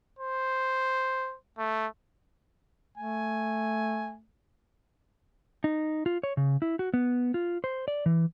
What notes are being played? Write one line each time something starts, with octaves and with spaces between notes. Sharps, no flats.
C5
A3
A3 G#5
D#4
F4
C#5
C#3
E4
F#4
B3
F4
C5
D5
E3